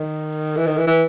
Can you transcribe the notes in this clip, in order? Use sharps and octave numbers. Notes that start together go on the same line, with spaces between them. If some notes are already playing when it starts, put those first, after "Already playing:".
Already playing: D#3
E3
D#3
E3
E3